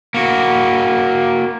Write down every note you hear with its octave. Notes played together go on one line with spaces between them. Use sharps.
A#3 F#4